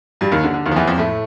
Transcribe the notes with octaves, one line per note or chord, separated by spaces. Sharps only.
G2 G3
D#2 D#3
D3
D3
D#2 D#3
F3
E2 E3
F2 F3
A2 A3